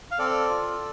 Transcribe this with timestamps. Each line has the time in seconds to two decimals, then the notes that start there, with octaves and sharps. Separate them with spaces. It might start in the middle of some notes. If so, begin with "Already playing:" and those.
0.11 F5
0.18 C4 A4 D5
0.49 F4